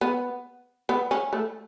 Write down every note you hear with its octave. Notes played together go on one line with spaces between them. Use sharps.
B3
B3
C#4
A3